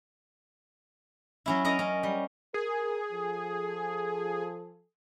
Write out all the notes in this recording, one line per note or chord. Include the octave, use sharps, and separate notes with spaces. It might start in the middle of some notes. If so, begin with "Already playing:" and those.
F#3 C#4 E4
C#4 A#4 D#5 A#5
C#4
G3
G#4 A#4
F3 A4